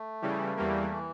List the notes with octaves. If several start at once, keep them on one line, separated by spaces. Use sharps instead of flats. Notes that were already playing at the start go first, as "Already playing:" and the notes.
Already playing: A3
C#3 E3 G3
E2 E3 G3 A#3
E3